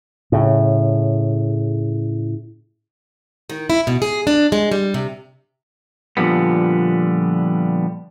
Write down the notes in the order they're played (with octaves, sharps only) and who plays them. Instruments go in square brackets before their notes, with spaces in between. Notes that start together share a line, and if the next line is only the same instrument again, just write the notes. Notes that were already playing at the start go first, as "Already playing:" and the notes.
[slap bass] A2 C#3
[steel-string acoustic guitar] D#3
E4
B2
G#4
D4
G#3
G3
C3
[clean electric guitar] A#2 D3 F3 G3 B3